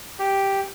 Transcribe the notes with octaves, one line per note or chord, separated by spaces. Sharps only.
G4